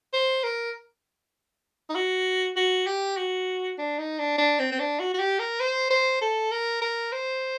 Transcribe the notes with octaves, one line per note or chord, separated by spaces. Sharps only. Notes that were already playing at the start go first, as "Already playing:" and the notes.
C5
A#4
D#4
F#4
F#4
G4
F#4
D4
D#4
D4
D4
C4
C4
D4
F#4
F#4
G4
A#4
C5
C5
A4
A#4
A#4
C5